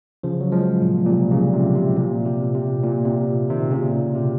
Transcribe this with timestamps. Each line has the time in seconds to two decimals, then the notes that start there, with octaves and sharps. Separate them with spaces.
0.23 C#3 F3
0.41 F#3
0.52 F3 G#3
0.82 A#2
1.06 A#2
1.11 C3
1.32 A#2 C#3
1.53 C3
1.76 C3
1.97 A#2
2.25 C3
2.55 C3
2.83 A#2
3.05 C3
3.49 C3 D#3
3.71 A#2 C#3
4.15 C3